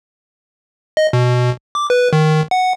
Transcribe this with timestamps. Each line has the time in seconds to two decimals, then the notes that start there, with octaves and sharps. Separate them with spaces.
0.97 D#5
1.13 B2
1.75 D6
1.90 B4
2.13 D#3
2.51 F#5